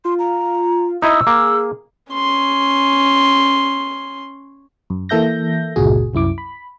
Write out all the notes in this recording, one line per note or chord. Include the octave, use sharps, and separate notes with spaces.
F4 C6
A#5
D#4 E4 D#5 C#6 E6
A#3 G#4
C#4 C6
F#2
E3 A#3 A4 E5 G6 A#6
G1 C#2 A#2 F#4 G#4
C2 F#2 E4 D6
B5